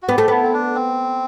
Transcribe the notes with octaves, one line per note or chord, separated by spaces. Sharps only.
F#4
B3 G4
A3
B3 E4
C4
D4
C4